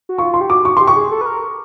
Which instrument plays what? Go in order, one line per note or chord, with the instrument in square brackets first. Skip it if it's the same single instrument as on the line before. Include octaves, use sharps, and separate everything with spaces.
[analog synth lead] F#4
[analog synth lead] F4 [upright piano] C#6
[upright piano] C6
[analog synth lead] G4
[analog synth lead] F#4 [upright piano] D6
[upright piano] C#6
[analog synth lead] G4 [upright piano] C6
[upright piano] C#6
[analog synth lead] G#4
A4
B4
A#4